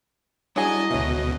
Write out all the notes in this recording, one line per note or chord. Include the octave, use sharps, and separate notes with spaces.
F#3 G3 D4 E4 G#4 D#5 G#5
D2 B2 C#5 E5